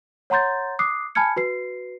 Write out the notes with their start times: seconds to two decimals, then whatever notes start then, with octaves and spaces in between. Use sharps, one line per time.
0.30 C#5 F#5 A#5 C6 G6 A6
0.79 D6 D#6 F#6 C7
1.15 G#5 A5 B5 F6 G#6 C#7
1.36 F#4 B4 C7